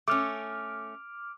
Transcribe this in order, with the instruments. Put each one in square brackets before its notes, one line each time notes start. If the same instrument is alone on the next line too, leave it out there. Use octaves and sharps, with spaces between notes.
[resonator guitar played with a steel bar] A3 C#4 [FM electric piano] D6 F6